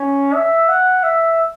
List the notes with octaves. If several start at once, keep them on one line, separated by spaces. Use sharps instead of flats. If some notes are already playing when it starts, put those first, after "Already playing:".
Already playing: C#4
E5
F#5
E5